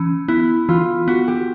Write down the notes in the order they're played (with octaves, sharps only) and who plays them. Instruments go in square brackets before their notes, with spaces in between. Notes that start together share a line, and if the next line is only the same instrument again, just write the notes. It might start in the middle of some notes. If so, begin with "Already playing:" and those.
Already playing: [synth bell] E3 C#4
[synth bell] B3 [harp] E4
[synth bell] E3 [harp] F4
[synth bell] B3 [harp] F#4
[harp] G4